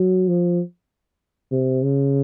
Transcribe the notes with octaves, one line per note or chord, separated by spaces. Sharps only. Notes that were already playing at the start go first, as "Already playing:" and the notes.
Already playing: F#3
F3
C3
C#3